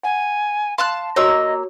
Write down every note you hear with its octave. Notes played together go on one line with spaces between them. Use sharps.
F#5 G#5
F5 A5 C6 F#6
A#3 F#4 G4 C#5 D#5 A#5 E6